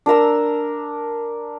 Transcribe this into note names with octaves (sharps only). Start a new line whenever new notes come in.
D4 A#4 A#5 E6